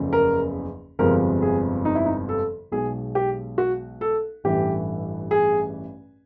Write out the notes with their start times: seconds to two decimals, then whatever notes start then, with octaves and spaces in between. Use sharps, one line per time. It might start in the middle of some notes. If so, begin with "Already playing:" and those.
Already playing: F#1 E2 C#3 F3 A3
0.13 A#4
0.99 G1 F2 C3 F3 G#3 A#4
1.42 G#4
1.85 D#4
1.95 E4
2.06 D#4
2.29 A4
2.72 B1 B2 G#3 G#4
3.15 G4
3.58 F#4
4.01 A4
4.44 A1 G2 E3 A3 G4
5.31 G#4